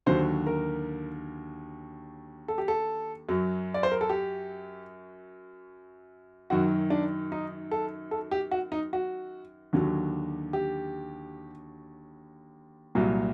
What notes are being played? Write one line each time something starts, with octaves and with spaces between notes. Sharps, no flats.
D#2 D3 F#3 C5
A#4
A4
G4
A4
F#2 F#3
D5
C5
A#4
A4
G4
F#2 D#3 F#3 F#4
D4
D#4
A4
A4
G4
F#4
D#4
F#4
D#2 D3 F#3
G4
C2 A#2 F#3